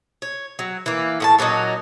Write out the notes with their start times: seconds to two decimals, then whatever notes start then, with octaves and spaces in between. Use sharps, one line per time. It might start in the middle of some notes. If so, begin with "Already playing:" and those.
0.22 C#5
0.59 F#3
0.86 E3 A#3
1.20 A2 F#4 A5
1.38 A#2 F#3 C#4 D#4